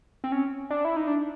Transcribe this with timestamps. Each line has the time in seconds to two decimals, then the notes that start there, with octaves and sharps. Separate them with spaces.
0.24 C4
0.32 C#4
0.70 D4
0.85 E4
0.97 D#4
1.07 D4